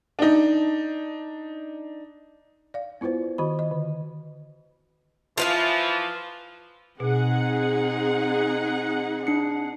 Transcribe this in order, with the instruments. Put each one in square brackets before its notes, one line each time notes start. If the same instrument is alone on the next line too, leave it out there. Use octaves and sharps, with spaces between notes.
[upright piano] D4 D#4
[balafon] D5 F5
B3 E4 F4 B4 C5
D#3 F#4 D#5 B5
D#5
D3
[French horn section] E3 F3 [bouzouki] F4 B4 F5
[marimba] B2 [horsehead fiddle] C4 D#4 [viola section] G#4 F#5
[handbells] D4 C7 C#7